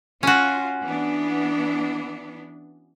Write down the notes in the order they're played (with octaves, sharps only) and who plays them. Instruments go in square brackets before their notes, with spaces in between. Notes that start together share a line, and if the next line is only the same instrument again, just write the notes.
[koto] C#4 F#4 [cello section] F4
[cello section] E3 B3 D4